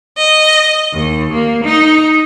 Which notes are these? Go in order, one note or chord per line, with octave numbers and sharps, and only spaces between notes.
D#5
D#2
A#3
D#4